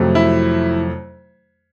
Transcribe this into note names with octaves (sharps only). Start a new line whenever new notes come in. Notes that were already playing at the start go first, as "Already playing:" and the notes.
Already playing: F2 C3 D#3 F#3 A3
E4 E5